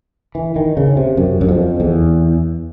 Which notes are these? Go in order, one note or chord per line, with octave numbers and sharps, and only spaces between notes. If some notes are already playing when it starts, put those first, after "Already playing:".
E3
D#3
C#3
C3
F#2
F#2
F2
E2